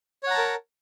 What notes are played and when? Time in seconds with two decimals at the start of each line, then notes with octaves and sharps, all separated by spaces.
0.23 C#5
0.27 F#5
0.31 A#5
0.34 A5
0.38 A#4